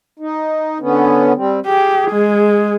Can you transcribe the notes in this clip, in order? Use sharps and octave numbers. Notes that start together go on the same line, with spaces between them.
D#4
D3 B3 C#4
G3 C4
G4 G#4
G#3